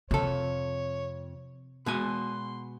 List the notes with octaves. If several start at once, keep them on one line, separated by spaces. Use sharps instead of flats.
F2 C3 A4 C#5
B2 G#3 G#5 C6